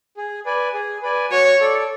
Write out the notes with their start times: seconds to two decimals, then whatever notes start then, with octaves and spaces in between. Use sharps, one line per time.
0.17 G#4
0.46 B4 D5 G#5
0.74 G#4
1.02 B4 D5 G#5
1.31 F#4 C#5
1.60 A4 D5